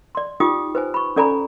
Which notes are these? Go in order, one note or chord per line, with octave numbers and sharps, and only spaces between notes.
D5 C6
D#4 F4 G4 G5 D6 D#6
B4 C5 G#5
B5 C#6
C#4 A4 D5 G#5 A#5 B5